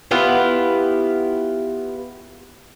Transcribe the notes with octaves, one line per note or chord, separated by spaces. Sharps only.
B3 E4 F4 G4